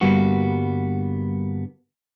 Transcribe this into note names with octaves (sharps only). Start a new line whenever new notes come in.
G2 D3 G3 A#3 B3 F#4